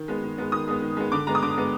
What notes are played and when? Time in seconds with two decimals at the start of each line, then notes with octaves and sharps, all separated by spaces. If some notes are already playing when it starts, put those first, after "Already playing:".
Already playing: D#3
0.08 G#3 B3
0.23 D#3
0.38 G#3 B3
0.52 D#3 D#6
0.68 G#3 B3
0.82 D#3
0.97 G#3 B3
1.12 D3 D6
1.27 G#3 B3 A#5
1.35 D#6
1.42 D3 D6
1.58 G#3 B3